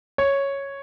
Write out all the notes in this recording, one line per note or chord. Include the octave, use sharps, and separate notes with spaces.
C#5